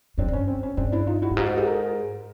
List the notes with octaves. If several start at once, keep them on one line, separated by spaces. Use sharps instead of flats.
F#2 C4 D4
G2
C#4
C4
C#4
G2 C4 D4
D4 E4
D#4 F4
E4 F#4
G2
G#2 F4 G4
F#4 G#4
G4 A4
G#4 A#4